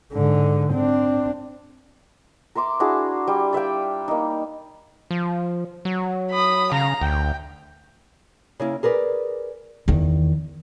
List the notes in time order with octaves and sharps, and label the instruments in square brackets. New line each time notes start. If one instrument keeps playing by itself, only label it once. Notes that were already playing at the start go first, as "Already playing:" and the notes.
[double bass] G#2 D3
C4 D4
[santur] A#4 E5 C6 D6
D4 E4 F#4 G#4
G3
D5 E5 F5 G5
A#3 D#4
[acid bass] F3
F#3
[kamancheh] B5 D#6
[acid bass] C#3 [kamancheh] F5 A#5
[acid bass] D2 [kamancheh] G5
[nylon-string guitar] C#3 A#3 E4
G#4 A#4 B4 D5
[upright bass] E2 D#3